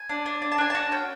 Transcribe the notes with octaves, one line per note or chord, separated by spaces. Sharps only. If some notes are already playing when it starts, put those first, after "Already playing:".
Already playing: G#5
D4
D4
D4
A5
D4 G#5
F#4 A5
C#4 G5